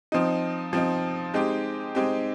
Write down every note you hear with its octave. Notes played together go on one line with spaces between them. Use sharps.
F3 C4 D#4
F3 C4 D#4
G#3 C4 D#4 G4
G#3 C4 D#4 G4